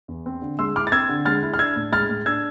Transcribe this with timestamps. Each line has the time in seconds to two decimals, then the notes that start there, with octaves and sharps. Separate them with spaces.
0.08 E2
0.26 C4
0.42 D3
0.59 G#3 C6 E6
0.76 E4 D6 F6
0.87 A6
0.92 C4 E6 G#6
1.09 D3
1.25 G#3 F6 A6
1.43 E4
1.54 F6
1.59 D4 E6 G#6
1.76 A2
1.92 G#3 F6 A6
2.09 A2
2.26 D4 E6 G#6